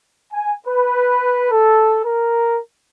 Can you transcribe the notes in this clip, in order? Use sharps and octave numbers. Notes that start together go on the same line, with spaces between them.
G#5
B4
A4
A#4